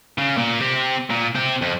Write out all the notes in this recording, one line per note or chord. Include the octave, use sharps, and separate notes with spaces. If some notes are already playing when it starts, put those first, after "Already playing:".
C#3
A#2
C4 G4
A#2
C4 G4
F2